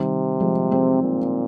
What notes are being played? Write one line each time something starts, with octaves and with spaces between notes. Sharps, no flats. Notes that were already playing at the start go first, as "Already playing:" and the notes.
Already playing: C3 D#3 G3
F3 G#3
G#3 C4
A#2